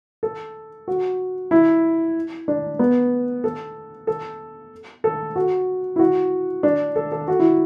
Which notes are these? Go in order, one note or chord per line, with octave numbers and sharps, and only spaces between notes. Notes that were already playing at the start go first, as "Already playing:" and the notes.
A4
F#4
E4
D4
B3
A4
A4
A4
F#4
E4
F#4
D4
A4
A4
F#4
E4